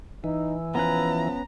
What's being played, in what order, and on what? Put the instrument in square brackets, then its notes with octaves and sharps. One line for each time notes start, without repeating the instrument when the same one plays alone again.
[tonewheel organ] E3 [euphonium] D#4
[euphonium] F3 [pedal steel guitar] B3 C#4 B4 [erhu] A#5